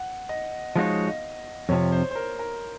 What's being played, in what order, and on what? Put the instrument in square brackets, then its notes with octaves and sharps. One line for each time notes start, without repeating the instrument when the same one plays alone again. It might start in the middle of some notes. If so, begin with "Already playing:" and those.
Already playing: [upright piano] F#5
D#5
[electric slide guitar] F3 G#3 D#4 F#4 C#5 [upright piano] F5
[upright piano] D#5
[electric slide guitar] F2 C3 F3 [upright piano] C#5
[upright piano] C5
C5
A#4
A#4